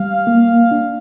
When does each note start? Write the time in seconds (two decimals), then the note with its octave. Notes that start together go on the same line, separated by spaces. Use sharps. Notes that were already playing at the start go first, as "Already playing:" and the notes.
Already playing: G3 F5
0.27 A#3
0.71 D4